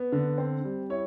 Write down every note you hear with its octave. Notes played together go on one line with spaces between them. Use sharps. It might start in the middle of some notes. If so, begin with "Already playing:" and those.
Already playing: B3
D3
C4
G3
E4 C#5